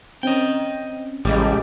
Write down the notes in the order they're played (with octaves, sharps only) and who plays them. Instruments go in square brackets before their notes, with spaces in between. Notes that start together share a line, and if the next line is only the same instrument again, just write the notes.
[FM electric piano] C4 C#4 [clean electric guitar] D#5 G5
[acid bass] A1 [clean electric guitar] C#3 G3 [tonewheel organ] G#3 G4 [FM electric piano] D6